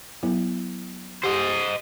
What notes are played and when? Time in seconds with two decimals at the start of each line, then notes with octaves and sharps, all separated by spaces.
0.23 F#3 B3 E4
1.24 G4 C5 D#5 F#5